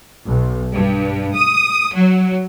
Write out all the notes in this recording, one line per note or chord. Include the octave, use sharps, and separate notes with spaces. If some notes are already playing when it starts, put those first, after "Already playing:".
B1
G2
D#6
F#3